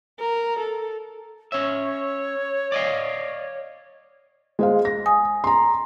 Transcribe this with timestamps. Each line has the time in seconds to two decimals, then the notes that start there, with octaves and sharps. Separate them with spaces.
0.19 A#4
0.59 A4
1.52 C#4 C#5 E5
2.72 D5 D#5 F5
4.59 G#3 C5 F5
4.85 A#6
5.06 G#5 D#6
5.44 A#5 C6